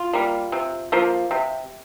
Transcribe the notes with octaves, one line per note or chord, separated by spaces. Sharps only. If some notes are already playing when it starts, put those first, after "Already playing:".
Already playing: F4
G3 A#3
C3
F3 A#3
C3